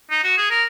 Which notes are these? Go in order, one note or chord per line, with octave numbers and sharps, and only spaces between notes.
D#4
F#4
G#4
A#4